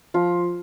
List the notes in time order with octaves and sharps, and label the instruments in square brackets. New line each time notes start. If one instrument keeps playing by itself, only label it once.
[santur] F3 F4